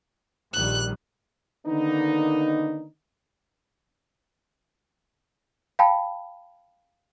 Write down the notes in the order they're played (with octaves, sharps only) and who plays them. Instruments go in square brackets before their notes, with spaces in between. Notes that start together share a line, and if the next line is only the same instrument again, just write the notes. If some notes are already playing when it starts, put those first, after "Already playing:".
[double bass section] A#1 D#3 G3 [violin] F#6
[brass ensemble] D3 D#3 A#3 B3 D4 D#4
[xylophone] F5 G5 A5 B5